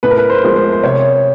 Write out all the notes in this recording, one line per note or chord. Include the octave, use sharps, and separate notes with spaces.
A2 B4
A#4
B4
C5
F3 G#3 B3
C5
C5
C3 C#5